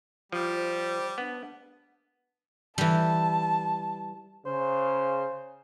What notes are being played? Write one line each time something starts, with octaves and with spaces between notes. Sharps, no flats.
F3 G3
C5
B3 D4
E3 G3 A5
C#3 C5